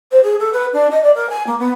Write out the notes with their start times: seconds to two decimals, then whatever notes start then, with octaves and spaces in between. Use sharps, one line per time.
0.12 C5
0.23 G#4
0.40 A4
0.53 B4
0.73 D4
0.91 D#5
1.03 D5
1.15 A#4
1.30 G#5
1.47 A#3
1.59 B3